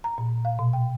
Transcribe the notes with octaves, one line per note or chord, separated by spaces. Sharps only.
A#5
A#2
F5
B2
G5